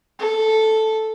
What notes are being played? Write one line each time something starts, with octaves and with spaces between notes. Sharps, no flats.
A4